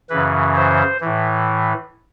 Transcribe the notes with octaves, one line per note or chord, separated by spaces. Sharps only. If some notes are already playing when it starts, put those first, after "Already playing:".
F#2 C#3 E3 B4
C5
A2 E3